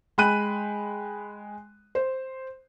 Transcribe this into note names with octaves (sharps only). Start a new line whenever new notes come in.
G#3 G5 B5 F#6 D#7
C5